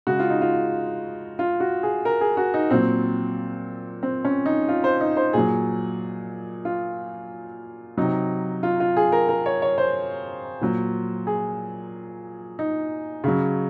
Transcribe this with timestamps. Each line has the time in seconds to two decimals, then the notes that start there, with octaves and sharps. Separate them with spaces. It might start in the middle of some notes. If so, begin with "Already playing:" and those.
0.07 C#3 G#3 F#4
0.19 F4
0.30 D#4
0.41 F4
1.39 F4
1.60 F#4
1.83 G#4
2.05 A#4
2.21 G#4
2.37 F#4
2.54 D#4
2.71 A#2 F#3 C4
4.03 C4
4.25 C#4
4.46 D#4
4.68 F4
4.84 C5
5.01 D#4
5.17 C5
5.33 A#2 F#3 G#4
6.65 F4
7.98 C3 F#3 D#4
8.63 F4
8.80 F4
8.97 G#4
9.12 A#4
9.29 A#4
9.46 C#5
9.62 C#5
9.78 C5
10.61 A#2 F#3
11.27 G#4
12.59 D#4
13.24 C#3 F#3